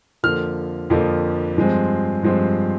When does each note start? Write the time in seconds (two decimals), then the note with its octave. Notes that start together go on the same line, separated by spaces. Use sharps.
0.23 F2 D3 F3 A#3 F6
0.90 F2 D3 F3 A#3
1.57 G2 F3 G#3 C4
2.23 G2 F3 G#3 C4